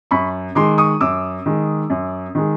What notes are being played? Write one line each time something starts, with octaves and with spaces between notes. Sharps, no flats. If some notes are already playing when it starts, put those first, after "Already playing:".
F#2 B5 C#6
D#3 G#3 C6 D6
C#6 D#6
F#2 D6 E6
D#3 G#3
F#2
D#3 G#3